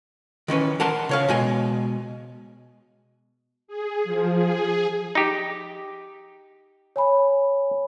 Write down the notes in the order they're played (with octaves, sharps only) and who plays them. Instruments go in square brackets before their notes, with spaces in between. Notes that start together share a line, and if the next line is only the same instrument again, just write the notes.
[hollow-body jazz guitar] D#3 E3 C#4 B4
A#4 F#5 A5 C6
C#3 C#5 F5
B2 G#3 G#5
[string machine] G#4
F3
G#4
[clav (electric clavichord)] D#4 G4
[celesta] C#5 G#5 B5